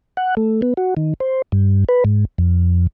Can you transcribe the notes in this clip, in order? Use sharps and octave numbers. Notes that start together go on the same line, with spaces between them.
F#5
A3
B3
F#4
D#3
C5
G2
B4
G#2
F2